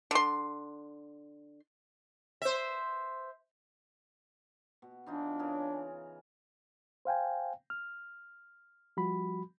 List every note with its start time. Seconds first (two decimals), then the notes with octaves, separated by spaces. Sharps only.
0.11 D3 C6
2.42 C5 E5
4.82 B2
5.06 E3 D4 D#4 F4
5.39 C#3 G#4 A#4
7.05 C5 F5 G5 G#5
7.70 F6
8.97 F3 G3 F#4 B5